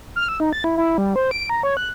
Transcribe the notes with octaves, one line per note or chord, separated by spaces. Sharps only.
F6
E6
D#4
A6
E4
E4
G3
C5
D7
A#5
C#5
F#6